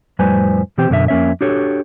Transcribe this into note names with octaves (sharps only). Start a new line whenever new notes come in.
F2 A2 G3 B4 C5 G#5
B2 E3 C4 G4 C5 G5
F#2 B2 D3 F4 E5
F2 A#3 C#4 C#5 E5
D4 F#4 G4 A4 C#5